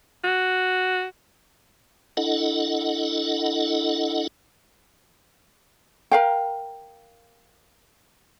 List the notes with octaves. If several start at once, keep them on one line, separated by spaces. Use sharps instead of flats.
F#4
D4 E4 A4 D#5 F#5
A#4 F5 G5